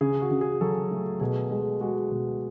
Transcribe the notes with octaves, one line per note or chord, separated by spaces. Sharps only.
C#3 G#4
F#4
C#3
G#4
F#3 A4
A3
B2 G#4
G#3
G#3 F#4
B2